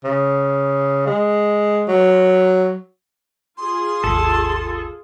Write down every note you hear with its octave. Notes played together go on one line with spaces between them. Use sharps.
C#3
G#3
F#3
F4 G#4 C6
G#1 D#2 A4